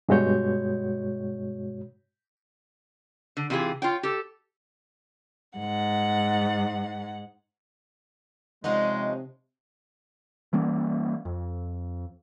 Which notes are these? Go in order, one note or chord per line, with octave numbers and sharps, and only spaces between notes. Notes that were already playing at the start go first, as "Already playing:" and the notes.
G2 B2 G#3 F#4 C#5 G6
D3
C3 E3 F4 G4 G#4
F4 C#5 G5
G4 A4
G#2 F#5
C3 F3 G#3 C#4 D#4 D#5 F#5
E3 G3 A#3 C#4
F2